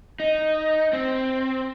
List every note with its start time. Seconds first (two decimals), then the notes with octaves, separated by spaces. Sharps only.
0.20 D#4
0.93 C4